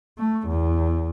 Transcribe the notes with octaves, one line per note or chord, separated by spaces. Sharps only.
A3
E2